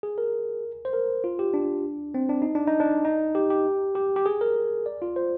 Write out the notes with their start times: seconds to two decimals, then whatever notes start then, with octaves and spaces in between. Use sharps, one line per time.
0.03 G#4
0.18 A#4
0.85 C5
0.93 A#4
1.24 F4
1.39 G4
1.54 D4
2.14 C4
2.29 D4
2.42 D#4
2.55 D4
2.67 D#4
2.80 D4
3.05 D#4
3.35 G4
3.50 G4
3.95 G4
4.16 G4
4.26 G#4
4.41 A#4
4.86 D5
5.02 F4
5.16 C5